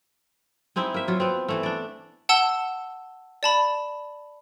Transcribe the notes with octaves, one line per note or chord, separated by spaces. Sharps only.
G#3 C4 D#4 E4
A#3 E5
F#3 F4
B3 C4
E3 A3
D4 D5
F#5 A5 E6 G7
D5 A5 B5